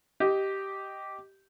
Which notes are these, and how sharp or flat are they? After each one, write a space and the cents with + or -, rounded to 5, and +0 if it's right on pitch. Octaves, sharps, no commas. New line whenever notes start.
G4 -10 D#5 +0